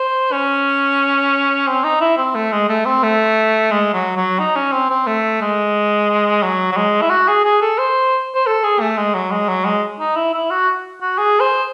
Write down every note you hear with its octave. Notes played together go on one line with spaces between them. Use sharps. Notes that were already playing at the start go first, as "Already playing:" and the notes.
Already playing: C5
C#4
C4
D#4
E4
C4
A3
G#3
A3
C4
A3
G#3
F#3
F#3
D#4
C#4
C4
C4
A3
G#3
F#3
F#3
G#3
E4
F#4
G#4
G#4
A4
C5
C5
A4
G#4
A3
G#3
F#3
G#3
F#3
G#3
D#4
E4
E4
F#4
F#4
G#4
C5